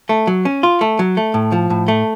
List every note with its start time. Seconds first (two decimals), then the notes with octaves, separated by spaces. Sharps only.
0.09 A3
0.27 F#3
0.45 C#4
0.63 F4
0.81 A3
0.99 F#3
1.17 A3
1.34 A2
1.52 F3
1.70 A2
1.88 A3